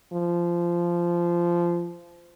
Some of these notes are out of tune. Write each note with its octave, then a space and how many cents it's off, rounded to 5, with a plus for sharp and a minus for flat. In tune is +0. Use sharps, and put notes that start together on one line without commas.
F3 -15